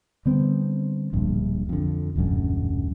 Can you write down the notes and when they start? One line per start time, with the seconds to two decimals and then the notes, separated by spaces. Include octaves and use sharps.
0.26 D3 G3 B3 C4
1.13 D1 A#1 G2
1.69 F2 D3
2.16 D#1 A1 F#2 D3